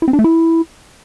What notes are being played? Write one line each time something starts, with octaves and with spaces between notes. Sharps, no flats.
E4
C4
D4
A3
E4